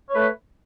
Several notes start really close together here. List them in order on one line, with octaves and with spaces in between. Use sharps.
C#5 B4 A3